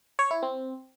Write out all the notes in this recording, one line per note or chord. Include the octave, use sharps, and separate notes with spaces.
C#5
E4
C4